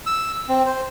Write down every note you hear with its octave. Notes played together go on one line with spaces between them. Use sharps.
E6
C4
C5